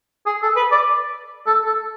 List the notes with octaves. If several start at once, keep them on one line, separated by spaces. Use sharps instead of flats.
G#4
A4
B4
D5
A4
A4